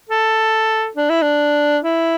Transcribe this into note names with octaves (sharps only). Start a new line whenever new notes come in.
A4
D4
E4
D4
E4